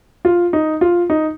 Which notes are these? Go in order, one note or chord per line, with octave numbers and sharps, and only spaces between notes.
F4
D#4
F4
D#4